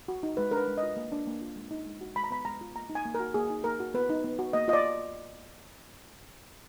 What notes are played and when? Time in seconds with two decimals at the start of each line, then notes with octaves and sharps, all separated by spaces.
0.08 F#4
0.23 D#4
0.37 G#3 B4
0.51 D4 A#4
0.57 B4
0.68 G#3
0.78 D#5
0.83 F4
0.97 A#3
1.12 D4
1.27 A#3
1.42 F4
1.56 G#3
1.71 D#4
1.86 G#3
2.01 F#4
2.16 G#3 B5
2.24 A#5
2.30 B3 B5
2.45 G#3 A#5
2.61 F4
2.75 A#3 A#5
2.90 D#4
2.95 G#5
3.05 A#3
3.15 A#4
3.20 F#4
3.34 A#3 G#4
3.50 D#4
3.64 A#3 A#4
3.80 F#4
3.94 B3 B4
4.10 D#4
4.24 B3
4.39 F#4
4.53 A#3 D#5
4.68 F4 D#5
4.73 D5